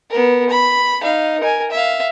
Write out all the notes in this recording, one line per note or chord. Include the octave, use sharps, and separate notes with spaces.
B3 A#4
B5
D#4 F5
A#4 G#5
E5 F5